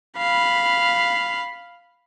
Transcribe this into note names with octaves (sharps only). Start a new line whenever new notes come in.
F5 B5